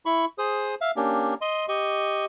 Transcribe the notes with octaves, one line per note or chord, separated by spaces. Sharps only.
E4 B5 C#6
G#4 C5 D#6
E5 F5
A#3 C#4 D4 G4
D#5 C6
G4 D#5 C#6